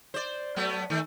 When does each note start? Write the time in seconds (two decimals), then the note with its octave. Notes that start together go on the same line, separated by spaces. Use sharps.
0.14 C5 D5
0.56 F#3 A3 B3
0.90 D#3 A3